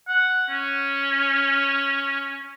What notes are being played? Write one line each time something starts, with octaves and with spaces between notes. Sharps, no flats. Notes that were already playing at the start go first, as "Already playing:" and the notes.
F#5
C#4